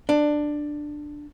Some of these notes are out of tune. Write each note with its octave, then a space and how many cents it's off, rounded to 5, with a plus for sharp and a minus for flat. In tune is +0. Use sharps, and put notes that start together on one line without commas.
D4 +10